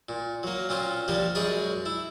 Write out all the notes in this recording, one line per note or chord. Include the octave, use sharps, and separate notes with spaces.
A#2
F#3 A#3
A#2 C4 C#4 F4
F3 G3 A#3 D4 G4
F#2 G#3 G#4 C#5 D5 B5
E4